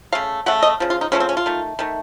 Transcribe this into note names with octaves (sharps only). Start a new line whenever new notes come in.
C#3 A3 F5
C#3 A3 F#5
D#5
C#3 F3
F4
D#4
C#3 F3 A3 C#4
C4
C#4
F4
D#3 A3
D#3 A3